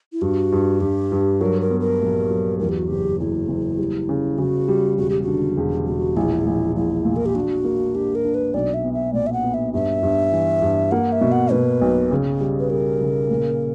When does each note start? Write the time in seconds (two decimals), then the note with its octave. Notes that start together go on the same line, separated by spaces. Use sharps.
0.13 E4
0.22 G2 F#4
0.52 G2
0.81 G2 G4
1.12 G2
1.41 F#3 A#4
1.61 A#4
1.71 B3
1.80 A#4
2.01 A#1
2.30 F#3
2.59 E2 A#4
2.69 G4
2.78 F#4
2.88 F#1 G4
3.20 F#1 E4
3.48 F#1
3.78 G3
4.09 C#3
4.38 C#3 F#4
4.68 G3
4.98 E1 F#4
5.10 G4
5.22 F#4
5.27 D3
5.57 E1
5.86 E1 F#4
6.16 A#1 E4
6.46 A#1
6.76 A#1 E4
7.05 A#2
7.16 A#4
7.26 G4
7.35 D4 F#4
7.65 A#3
7.95 D4 G4
8.15 A#4
8.25 D4
8.34 B4
8.54 B1 D5
8.74 E5
8.84 B3
8.93 E5
9.13 A#2 D5
9.27 E5
9.33 F#5
9.43 B3
9.54 E5
9.74 G2 E5
10.03 G2
10.32 E3
10.62 G2
10.92 A#3 F#5
11.12 E5
11.21 B2
11.32 F#5
11.51 B2 B4
11.81 B1
12.11 C#3
12.41 G3
12.59 B4
12.70 G3 A#4
13.01 C#3
13.30 A#2